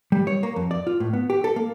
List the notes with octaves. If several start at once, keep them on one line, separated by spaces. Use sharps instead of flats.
G3
C#5
A#3
F2
D5
F4
A2
B3
G4
A4
A#3